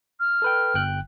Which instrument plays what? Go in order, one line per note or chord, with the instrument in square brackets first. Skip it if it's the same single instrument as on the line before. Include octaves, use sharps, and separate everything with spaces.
[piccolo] F6
[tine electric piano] A4 B4 G5
G1 G5 F#6